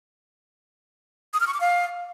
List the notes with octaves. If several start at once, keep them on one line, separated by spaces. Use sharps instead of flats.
D#6
F6
C#6
D6
F5